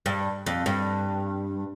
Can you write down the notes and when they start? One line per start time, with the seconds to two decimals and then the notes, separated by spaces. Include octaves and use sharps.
0.06 G2
0.46 F2
0.66 G2